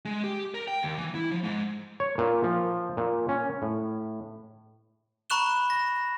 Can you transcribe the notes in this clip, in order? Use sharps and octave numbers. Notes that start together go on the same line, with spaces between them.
G#3
G4
A#4
G5
D#2
E3
E4
F3
G#2
C#5
A#2
F3
A#2
C#4
A2
A#5 B5 C#6 F#6 E7 G7
A#6